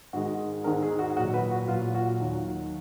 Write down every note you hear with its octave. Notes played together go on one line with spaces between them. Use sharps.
G#2 D#3 G#3 F#4
G#2 D#3 G#3 A#4
G#4
F#4
A#2 F#3 F#4
B4
F#4
A#2 F#3 F4
F#4
D#2 D#3 F#3